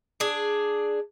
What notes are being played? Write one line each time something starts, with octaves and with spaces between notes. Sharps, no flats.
D4 G#4